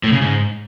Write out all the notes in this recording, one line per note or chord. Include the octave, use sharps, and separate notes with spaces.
A2
C#3
G#2